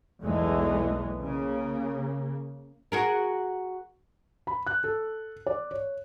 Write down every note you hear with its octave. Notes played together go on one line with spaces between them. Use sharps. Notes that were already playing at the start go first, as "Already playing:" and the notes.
B1 E2 E3 G#3 A3
C#3 A#3
F#4 G#4 A#4
B5
F#6
A4
D5
C#5